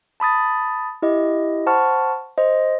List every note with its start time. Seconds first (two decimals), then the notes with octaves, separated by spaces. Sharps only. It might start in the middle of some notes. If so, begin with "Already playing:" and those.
0.20 A5 B5 D#6 A6
1.02 E4 G4 D#5
1.66 C5 F#5 A5 B5 C#6 F6
2.38 C5 D#5